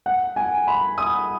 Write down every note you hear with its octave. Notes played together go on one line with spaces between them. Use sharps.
F#5
G#5
B5
D#6